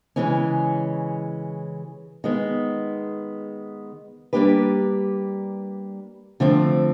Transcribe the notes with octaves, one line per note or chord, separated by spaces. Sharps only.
C#3 E3 G#3 C#4
D#3 G#3 B3
G3 A#3 D4 G4 B4
F2 D3 F3 A3 C4